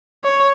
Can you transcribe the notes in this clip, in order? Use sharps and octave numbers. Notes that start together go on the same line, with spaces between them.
C#5